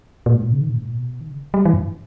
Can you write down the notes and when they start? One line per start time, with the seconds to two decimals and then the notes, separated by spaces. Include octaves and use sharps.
0.26 A#2
0.35 G#2
0.42 A#2
0.52 C#3
0.61 D#3
0.69 A#2
0.77 G#2
0.87 A#2
0.96 B2
1.21 D#3
1.30 C#3
1.54 G3
1.65 E3
1.74 G2